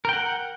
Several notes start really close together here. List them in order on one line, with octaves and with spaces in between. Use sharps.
A#4 G5 F#5